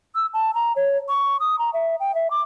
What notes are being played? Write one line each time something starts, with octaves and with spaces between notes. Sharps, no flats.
E6
A5
A#5
C#5
C#6
D#6
A#5
E5
G5
E5
D6